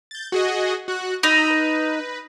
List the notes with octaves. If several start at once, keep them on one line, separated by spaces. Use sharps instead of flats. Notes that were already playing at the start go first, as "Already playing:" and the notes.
G6 A6
F#4 G#4 D#5
F#4 F#6
D#4 A#5 B5 E6
B4